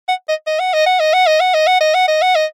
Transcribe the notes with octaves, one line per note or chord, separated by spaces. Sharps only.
F#5
D#5
D#5
F#5
D#5
F#5
D#5
F#5
D#5
F#5
D#5
F#5
D#5
F#5
D#5
F#5
D#5